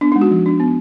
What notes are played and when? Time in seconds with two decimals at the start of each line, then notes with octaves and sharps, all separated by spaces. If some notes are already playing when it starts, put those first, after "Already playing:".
0.01 B3 D4
0.12 D#4
0.16 G#3
0.21 F#4
0.31 F3
0.46 D4
0.60 B3